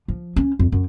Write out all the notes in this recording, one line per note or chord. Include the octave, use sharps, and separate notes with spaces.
F3
C#4
F2
F#2